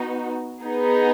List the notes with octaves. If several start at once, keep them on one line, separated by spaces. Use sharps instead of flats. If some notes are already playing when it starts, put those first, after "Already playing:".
Already playing: B3 D#4 F#4
B3 D#4 G#4